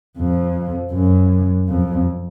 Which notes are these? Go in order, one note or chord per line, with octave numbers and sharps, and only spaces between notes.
F2
F#2
F2